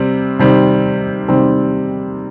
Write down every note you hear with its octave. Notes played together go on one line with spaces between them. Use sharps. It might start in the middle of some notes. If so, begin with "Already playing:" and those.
Already playing: C3 G3 C4
C3 D#3 G3 C4
C3 D#3 G3 C4